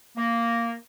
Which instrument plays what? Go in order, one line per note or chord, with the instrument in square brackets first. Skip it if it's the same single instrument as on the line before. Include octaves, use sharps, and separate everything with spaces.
[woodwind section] A#3